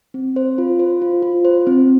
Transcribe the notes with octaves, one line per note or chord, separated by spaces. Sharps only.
C4
C5
F4
C5
F4
F4
C5
C4